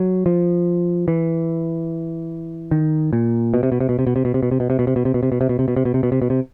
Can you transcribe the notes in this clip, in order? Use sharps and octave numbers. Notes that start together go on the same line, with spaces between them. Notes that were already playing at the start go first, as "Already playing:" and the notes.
Already playing: F#3
F3
E3
D#3
A#2
B2
C3
B2
C3
B2
C3
B2
C3
B2
C3
B2
C3
B2
C3
B2
C3
B2
C3
B2
C3
B2
C3
B2
C3
B2
C3
B2
C3
B2
C3
B2
C3